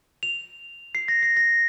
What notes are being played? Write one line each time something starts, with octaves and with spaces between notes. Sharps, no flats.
F7
C7
A#6
C7
A#6